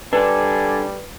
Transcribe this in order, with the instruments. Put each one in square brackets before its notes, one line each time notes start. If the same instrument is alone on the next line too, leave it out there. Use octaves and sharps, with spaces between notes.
[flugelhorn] G3 [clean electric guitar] D4 A4 D5 [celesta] B4 [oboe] G#5